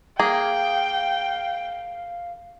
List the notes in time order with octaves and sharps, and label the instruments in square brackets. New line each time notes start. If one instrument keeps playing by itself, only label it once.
[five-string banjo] A#3 G#4 [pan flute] F5 [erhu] G5